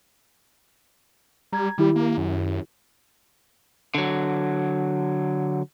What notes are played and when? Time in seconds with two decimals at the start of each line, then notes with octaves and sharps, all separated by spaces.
1.52 G3 A#5 G#6
1.78 D#3 G3 E4 G4
1.96 A#3
2.18 F#2
3.95 D3 F#3